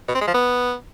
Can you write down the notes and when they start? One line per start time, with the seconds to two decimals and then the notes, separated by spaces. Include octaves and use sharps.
0.08 B2
0.15 C4
0.21 G#3
0.27 F3
0.34 B3